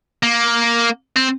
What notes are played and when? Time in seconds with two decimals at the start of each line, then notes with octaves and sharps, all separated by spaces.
0.23 A#3
1.16 C4